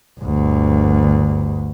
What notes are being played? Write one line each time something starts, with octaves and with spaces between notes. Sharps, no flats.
G1 D2